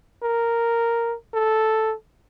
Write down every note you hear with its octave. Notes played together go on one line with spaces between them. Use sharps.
A#4
A4